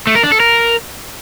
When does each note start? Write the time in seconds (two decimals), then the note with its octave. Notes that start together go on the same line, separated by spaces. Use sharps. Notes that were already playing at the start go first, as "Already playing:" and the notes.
0.07 A3
0.15 A#4
0.24 D4
0.32 A4
0.40 A#4